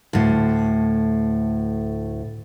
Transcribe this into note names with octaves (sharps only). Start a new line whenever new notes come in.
D2 A2